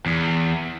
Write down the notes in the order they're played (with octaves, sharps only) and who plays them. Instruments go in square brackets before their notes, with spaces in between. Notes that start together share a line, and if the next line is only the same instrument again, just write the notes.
[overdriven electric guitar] E2